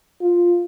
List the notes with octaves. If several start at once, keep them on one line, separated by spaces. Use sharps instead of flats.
F4